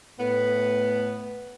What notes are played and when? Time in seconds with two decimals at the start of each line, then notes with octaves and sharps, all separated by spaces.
0.19 A2 B3